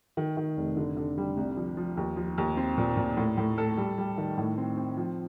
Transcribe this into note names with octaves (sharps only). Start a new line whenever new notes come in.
D#3
D#3
F1
D3
D3
G3
C2
F3
F3
D#2
F3
D#2
C4
A#2
A#2
A2
A2
A4
G3
G3
D#3
A2
C4
C4
F3